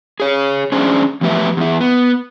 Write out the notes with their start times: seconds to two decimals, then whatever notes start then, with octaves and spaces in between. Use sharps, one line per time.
0.20 G#4 C#5
0.72 C#4 D4 G#4 C5
1.21 E2 F3 A3 G4 B4 E5
1.57 E2 E4
1.81 B3